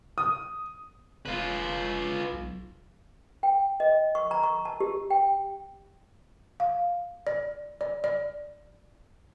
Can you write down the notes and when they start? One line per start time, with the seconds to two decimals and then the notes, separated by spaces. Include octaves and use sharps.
0.18 D#6
1.26 F1 F4 B4
2.32 B1
3.43 G5
3.80 D#5
4.15 C#6
4.31 A#5
4.43 C#6
4.65 A5
4.80 G4
5.10 G5
6.60 F5
7.27 D5
7.81 D5
8.04 D5